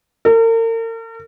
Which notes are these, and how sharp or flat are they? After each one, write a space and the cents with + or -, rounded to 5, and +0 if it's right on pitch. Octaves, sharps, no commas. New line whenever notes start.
A#4 -40